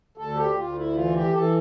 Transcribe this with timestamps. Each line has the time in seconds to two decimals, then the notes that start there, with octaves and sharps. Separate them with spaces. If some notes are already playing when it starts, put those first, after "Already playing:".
0.17 D2 A4
0.36 G4
0.55 D2 F4
0.76 E4
0.94 E3 F4
1.14 G4
1.33 E3 A4